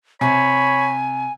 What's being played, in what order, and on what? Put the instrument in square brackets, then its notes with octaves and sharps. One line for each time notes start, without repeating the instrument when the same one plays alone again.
[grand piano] C3 [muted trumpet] C#5 [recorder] G#5 [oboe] B5